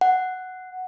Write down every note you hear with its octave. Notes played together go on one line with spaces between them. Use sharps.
F#5